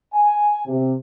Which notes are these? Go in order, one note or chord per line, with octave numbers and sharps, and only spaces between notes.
G#5
C3